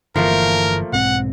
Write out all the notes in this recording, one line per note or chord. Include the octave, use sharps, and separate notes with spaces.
G1 E3 F3 A3 A#3 A#4
B1 G#2 C4 F#5